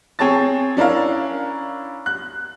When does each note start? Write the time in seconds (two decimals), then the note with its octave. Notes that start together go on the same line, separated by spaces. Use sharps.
0.19 C4 G#4 C#5 A5 A6
0.77 C#4 D4 E4 A#4 F5
2.06 F#6